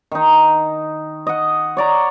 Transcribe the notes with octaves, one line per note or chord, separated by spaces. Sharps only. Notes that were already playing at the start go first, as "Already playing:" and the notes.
D#3 D#4
D#5 F#5
C#5 D5 A#5